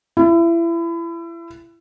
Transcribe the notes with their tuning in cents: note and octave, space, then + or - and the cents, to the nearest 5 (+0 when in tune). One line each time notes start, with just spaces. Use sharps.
E4 +30